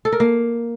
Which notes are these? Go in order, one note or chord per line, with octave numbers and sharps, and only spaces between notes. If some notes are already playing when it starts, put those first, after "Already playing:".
A4
A#4
A#3